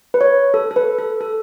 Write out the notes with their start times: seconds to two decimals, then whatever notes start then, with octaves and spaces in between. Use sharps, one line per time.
0.14 B4
0.21 C#5
0.54 A4
0.71 A4
0.76 B4
0.98 A4
1.21 A4